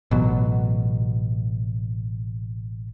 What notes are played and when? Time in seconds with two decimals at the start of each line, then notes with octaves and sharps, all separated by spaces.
0.11 A1 B2 F#3